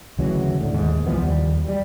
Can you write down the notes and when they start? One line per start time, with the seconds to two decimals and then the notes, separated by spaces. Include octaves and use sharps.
0.19 D2 C#3 E3 F#3
0.61 A2 D3
0.73 D#1 D#2 G#2
1.07 C#2 E3 F3 B3
1.22 D#2 G3
1.69 G3